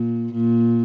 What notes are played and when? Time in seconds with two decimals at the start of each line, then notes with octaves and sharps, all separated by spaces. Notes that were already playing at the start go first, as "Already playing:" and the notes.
Already playing: A#2
0.33 A#2